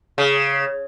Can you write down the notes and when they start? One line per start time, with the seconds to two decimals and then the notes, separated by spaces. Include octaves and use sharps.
0.18 C#3